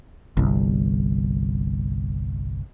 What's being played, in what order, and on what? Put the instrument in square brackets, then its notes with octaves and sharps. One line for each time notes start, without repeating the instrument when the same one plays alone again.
[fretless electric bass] G1 C2